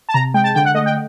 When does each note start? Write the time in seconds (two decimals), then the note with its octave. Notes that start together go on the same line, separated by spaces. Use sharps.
0.09 A5
0.14 C3 A#5
0.34 G#3 G5
0.44 A5
0.55 D3 G5
0.65 F#5
0.75 A3 D#5
0.86 G5